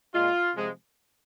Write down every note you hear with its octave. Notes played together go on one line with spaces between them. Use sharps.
A#2 G#3 F4
C3 F3 G#3